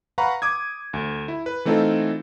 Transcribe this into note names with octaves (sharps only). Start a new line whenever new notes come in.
B4 F5 F#5 A#5 B5 C#6
D6 D#6 G#6
D2
E4
B4
E3 A3 C4 D#4 F4 A4